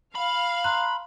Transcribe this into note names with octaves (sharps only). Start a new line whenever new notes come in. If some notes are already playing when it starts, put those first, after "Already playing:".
F5 B5
A#5 C6 F#6